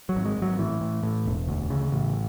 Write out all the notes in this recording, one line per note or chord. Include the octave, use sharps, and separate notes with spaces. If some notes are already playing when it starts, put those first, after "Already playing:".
F#3
G#1
G#3
G#1
F#3
A2 E3
A2
A2
E1
D2
C#3
A1